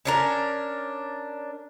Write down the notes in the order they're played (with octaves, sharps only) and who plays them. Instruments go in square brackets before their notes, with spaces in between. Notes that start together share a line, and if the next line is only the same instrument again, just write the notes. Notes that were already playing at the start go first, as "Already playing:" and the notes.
[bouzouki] C#4 D4 A#4